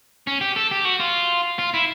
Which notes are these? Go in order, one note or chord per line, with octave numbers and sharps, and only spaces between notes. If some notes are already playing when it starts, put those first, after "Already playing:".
C#4
G4
A4
G4
F#4
F4
F4
E4